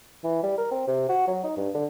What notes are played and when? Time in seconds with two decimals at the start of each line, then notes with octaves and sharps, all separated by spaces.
0.24 E3
0.43 G3
0.58 A#4
0.71 C4
0.87 C3
1.09 F#4
1.28 F#3
1.44 D#4
1.57 G2
1.75 D3